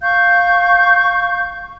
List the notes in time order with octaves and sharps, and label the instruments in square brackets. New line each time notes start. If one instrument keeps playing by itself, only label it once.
[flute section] F5 C#6 G6